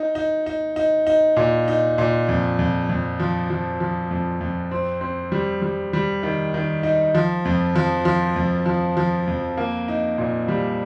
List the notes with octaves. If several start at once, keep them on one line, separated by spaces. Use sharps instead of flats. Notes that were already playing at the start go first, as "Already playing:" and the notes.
Already playing: D#4
D#4
D#4
D#4
D#4
A#2
D#4
A#2
F2
F2
F2
F3
F3
F3
F2
F2
C4
C4
G3
G3
G3
D#3
D#3
D#4
F3
F2
F3
F3
F2
F3
F3
F2
A#3
D#4
A#2
G3